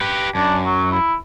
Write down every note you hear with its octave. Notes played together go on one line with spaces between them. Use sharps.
G4 B4
F#2 D4
F#3
E4